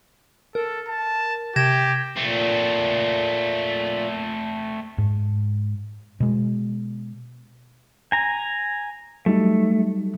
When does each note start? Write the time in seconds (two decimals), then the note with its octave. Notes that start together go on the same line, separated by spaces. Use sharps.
0.55 A4 A#4
0.88 A5
1.56 C3 G4 G#6 A#6 E7
2.17 A#2 A3 C4
4.98 G#2
6.20 B2 G#3
8.12 G#5 A#5
9.26 F#3 G3 A3 D#4